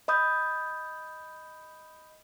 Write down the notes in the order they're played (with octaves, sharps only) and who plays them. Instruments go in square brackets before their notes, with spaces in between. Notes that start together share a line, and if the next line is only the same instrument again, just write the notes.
[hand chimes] D#5 B5 D#6 G6